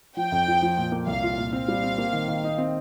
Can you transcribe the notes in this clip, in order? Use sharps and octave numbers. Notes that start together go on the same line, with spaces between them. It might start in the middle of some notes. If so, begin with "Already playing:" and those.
F3 G5
F2
F3
F3
A#2
A#3
C2 F5
F4
A#2
C4 F5
G3
C4
A#3
D#3
D#3
D#4
C4